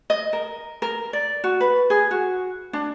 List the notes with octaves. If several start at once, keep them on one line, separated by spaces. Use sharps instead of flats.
D#5
A#4
A#4
D5
F#4
B4
G#4
F#4
D4